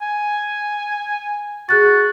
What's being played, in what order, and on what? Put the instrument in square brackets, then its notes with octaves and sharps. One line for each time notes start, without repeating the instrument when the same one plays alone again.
[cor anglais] G#5
[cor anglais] F#4 [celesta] G#4 F#6 A6